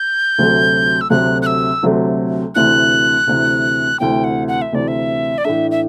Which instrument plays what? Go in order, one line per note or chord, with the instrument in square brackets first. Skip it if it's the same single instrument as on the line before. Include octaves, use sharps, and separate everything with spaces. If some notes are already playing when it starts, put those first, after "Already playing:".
Already playing: [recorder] G6
[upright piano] D2 C3 F#3 A3
[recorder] E6
[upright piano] D2 C3 F#3 A3 [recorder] F#6
[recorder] F#6
E6
[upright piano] D2 C3 F#3 A3
[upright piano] D2 C3 E3 [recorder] F#6
[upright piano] D2 C3 E3
[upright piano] D2 C3 E3 [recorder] G5
[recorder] F#5
F#5
E5
[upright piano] D2 C3 E3 [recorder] D5
[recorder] E5
D5
[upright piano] A2 E3 A3 D4 [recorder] E5
[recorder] E5